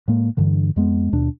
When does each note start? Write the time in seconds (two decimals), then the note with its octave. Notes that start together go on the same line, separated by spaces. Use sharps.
0.08 A2 G#3 A#3
0.37 G2 D3 E3
0.76 F2 G#3 B3
1.12 D#2 B2 D4